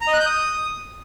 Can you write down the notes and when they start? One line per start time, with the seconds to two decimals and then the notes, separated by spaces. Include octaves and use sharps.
0.01 A#5
0.07 D#5
0.14 F#6
0.20 G6
0.26 D#6